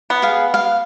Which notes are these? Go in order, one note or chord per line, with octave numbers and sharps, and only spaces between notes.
B3
G#4 F5
F5